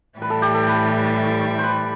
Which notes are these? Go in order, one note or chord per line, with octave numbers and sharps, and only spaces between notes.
A2 E3 G3 B4
A4
G4
A4
B4
B4 C5